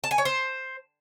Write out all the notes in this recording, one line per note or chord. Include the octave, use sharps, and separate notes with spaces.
A5
G#5
C#5
C5